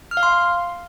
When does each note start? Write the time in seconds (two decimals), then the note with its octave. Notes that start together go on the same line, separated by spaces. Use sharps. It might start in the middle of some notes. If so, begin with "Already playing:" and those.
0.11 F6
0.17 F5
0.23 C6